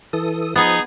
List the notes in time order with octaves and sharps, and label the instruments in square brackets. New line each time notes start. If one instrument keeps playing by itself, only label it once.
[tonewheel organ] E3 A4 D#6
[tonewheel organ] F3 [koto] B3 [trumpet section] D#4 G#4